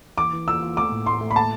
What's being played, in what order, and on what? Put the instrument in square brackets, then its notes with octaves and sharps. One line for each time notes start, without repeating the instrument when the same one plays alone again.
[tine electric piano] E3 [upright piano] D6
[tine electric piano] E3
[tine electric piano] F4 [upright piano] E6
[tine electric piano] F4
[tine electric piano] A3 [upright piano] D6
[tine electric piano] A2
[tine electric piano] A2 [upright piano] C6
[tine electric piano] A3
[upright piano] B5
A5